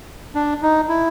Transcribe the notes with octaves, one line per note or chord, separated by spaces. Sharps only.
D4
D#4
E4